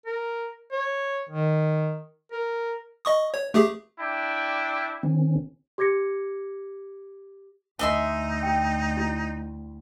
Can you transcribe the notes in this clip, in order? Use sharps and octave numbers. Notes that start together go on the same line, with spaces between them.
A#4
C#5
D#3
A#4
D#5 C#6 D#6
C#5
A3 G4 G#4
D4 E4 G5
D#3 C4 C#4
G4 D6 G#6 A#6 C#7
D2 D#4 D#5 E5 G#5 C6
G5
E4